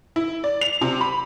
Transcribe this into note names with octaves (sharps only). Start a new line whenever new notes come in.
E4
D5
F7
C3
B5